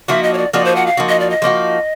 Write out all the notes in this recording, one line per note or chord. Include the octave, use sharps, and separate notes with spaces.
F3 A#3 D#4 F#4 E5
D#5
C#5
D5
F3 A#3 D#4 F#4 D5
C5
F#5
F5
F3 A#3 D#4 F#4
D#5
D5
D#5
F3 A#3 D#4 F#4